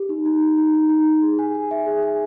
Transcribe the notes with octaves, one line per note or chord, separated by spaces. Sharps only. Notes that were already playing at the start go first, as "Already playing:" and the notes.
Already playing: G4
D#4
D#4
D#4
D#4
D#4
D#4
D#4
G#4
G#5
G#5
E5
G#4
G#5